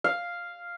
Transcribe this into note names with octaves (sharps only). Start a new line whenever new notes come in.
F5